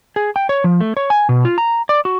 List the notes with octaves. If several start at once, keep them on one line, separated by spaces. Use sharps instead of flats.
G#4
G5
C#5
F3
A3
C#5
G#5
B2
F4
A#5
D5
F#4